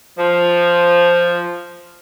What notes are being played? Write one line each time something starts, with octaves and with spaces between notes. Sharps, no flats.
F3